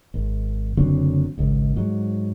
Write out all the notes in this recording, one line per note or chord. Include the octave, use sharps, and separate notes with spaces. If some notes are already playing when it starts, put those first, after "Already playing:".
G#1
F#1 D3 F#3 C4
G#1 C#2
G#2 F#3